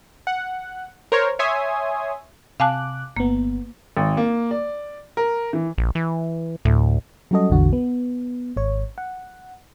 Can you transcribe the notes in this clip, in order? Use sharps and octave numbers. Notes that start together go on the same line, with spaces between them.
F#5
A#4 C5 C#5
C#5 E5 G#5 C6 D#6
C3 F5 G#5 A5 D6 F#6
G1 A#3 B3
G#1
A#3
D5
A#4
E3
A#1
E3
D2 A2
F#3 G3 C#4 F#4 A4 D#5
A1 E2 D3 F#4
B3
G#1 C#5
F#5